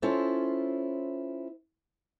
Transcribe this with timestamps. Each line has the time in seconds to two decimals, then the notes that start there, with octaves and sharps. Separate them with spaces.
0.02 C#4 E4 F4 A4 C5